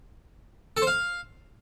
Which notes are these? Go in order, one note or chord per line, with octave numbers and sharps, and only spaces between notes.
A4
C5
F5